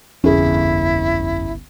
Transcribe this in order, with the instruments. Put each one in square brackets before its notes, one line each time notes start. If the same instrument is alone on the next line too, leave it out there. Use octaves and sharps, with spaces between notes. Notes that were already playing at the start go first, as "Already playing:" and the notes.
[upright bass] G1 C2 [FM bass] F2 [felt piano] C#4 G#4 [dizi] E4